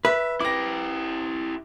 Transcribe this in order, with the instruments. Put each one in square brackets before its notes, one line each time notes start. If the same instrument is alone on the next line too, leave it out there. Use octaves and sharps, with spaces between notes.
[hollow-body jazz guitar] B4 [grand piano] E5
[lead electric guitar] E4 G4 [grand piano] D6 A#6